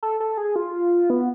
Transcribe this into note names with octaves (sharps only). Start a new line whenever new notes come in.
A4
A4
G#4
F4
B3